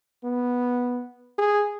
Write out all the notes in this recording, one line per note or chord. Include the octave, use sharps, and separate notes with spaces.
B3
G#4